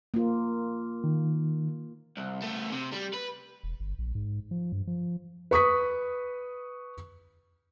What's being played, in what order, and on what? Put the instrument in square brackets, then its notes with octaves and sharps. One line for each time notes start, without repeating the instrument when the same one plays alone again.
[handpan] A#3 F4
[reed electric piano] D#3
[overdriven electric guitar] C2
A3 B3
C3
G3
B4
[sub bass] E1
G1
A#1
G#2
F3
G2
F3
[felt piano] B4 C#6 D#6 B6